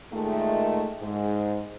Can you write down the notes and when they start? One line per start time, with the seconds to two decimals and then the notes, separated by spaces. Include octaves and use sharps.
0.13 A#2 D#3 G#3 A3
1.02 G#2